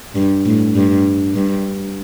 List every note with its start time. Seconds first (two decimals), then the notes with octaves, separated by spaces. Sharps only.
0.15 G2
0.46 A2
0.76 G2
1.35 G2